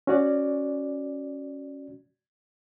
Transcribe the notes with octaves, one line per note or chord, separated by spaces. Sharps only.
C#4 F#4 D5